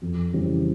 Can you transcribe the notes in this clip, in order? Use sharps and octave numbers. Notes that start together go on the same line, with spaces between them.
F2
C#3 E3 G3 C4